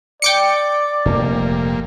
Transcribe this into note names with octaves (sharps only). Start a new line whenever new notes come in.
D5 G5 D6 C#7
F1 A#2 G3 A#3